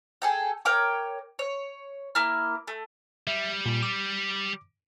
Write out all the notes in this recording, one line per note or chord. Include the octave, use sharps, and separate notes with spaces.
G#4 A4 G5
A#4 C#5 G5 D6
C#5
A#3 E4 F6
A3
G3 E5
A#2
D6